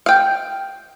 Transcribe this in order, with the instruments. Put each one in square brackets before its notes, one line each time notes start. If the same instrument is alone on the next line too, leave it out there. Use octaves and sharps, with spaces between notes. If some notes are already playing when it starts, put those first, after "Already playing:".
[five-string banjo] F5 G5